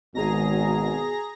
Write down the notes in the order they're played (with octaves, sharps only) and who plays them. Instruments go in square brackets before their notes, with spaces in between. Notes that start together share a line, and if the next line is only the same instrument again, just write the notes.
[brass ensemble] G#1 [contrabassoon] B2 [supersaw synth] G#4 A#5 A#6